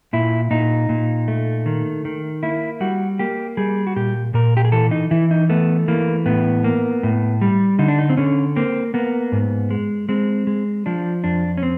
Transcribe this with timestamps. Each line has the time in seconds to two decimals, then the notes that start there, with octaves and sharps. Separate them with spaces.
0.13 A#2 E4
0.51 A#2 D#4
0.89 A#2
1.28 A3
1.66 D#3
2.05 D#3
2.43 A#3 E4
2.80 G3 F#4
3.19 A#3 G4
3.57 G3 G#4
3.87 F#4
3.96 A#2 G4
4.34 A#2 A#4
4.57 G4
4.65 G#4
4.72 E3 A4
4.91 D#4
5.11 E3 E4
5.31 D#4
5.49 A3 B3
5.88 E3 A#3
6.26 A2 B3
6.64 A#3
7.03 A2
7.42 G3
7.79 D3 D#4
7.88 D4
7.98 D#4
8.10 C4
8.17 D3 C#4
8.56 A#3 C4
8.94 A#3 B3
9.32 G#2
9.71 G#3
10.09 G#3 C4
10.47 G#3
10.86 F3 D4
11.24 F2 D4
11.57 C#4
11.63 C4